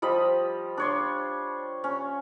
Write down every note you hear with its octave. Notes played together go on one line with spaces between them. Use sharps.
F3 G3 D#5 B5
D4 C#5 C6
C#4